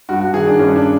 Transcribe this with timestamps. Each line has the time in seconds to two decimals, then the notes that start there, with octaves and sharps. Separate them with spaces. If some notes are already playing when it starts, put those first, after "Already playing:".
0.09 G2 F#4
0.21 F#4
0.34 D#3 G#4
0.47 D4
0.59 G2 C#4
0.76 D4